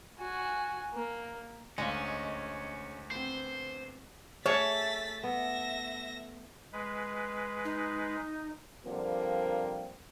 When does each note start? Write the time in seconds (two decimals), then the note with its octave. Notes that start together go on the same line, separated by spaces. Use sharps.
0.19 F#4 G#5
0.94 A#3
1.78 D2 G#3 C#4 D5 D#5 F5
3.11 B3 C4 C5
4.46 A3 G#4 C#5 A6 B6
5.24 B3 E5 A#6
6.72 G#3 B4
7.65 D#4
8.86 D3 F3 G3 A#3 C4 A#4